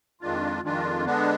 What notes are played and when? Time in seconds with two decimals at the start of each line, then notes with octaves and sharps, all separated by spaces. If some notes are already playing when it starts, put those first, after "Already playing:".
0.21 F2 D#3 G#3 D4 F4
0.63 F2 D#3 G#3 D4 F4
1.05 D3 G#3 B3 D4